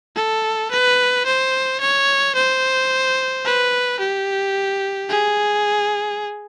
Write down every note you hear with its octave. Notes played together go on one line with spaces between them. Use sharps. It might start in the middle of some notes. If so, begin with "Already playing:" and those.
A4
B4
C5
C#5
C5
B4
G4
G#4